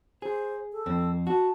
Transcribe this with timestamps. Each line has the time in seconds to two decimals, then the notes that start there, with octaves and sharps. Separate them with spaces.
0.22 G#4 C5
0.72 A4
0.86 F2 C4
1.27 F#4 A5